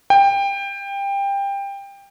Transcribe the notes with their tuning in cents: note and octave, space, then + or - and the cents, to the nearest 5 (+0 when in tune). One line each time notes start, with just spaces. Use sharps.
G5 +20